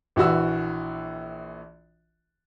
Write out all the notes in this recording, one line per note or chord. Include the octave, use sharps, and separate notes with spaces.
A#1 E3 F#4 E6